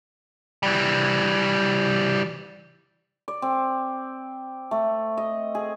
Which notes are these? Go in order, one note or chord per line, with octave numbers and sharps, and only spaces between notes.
E3 G3
D5
C4
A3
D#5
G#4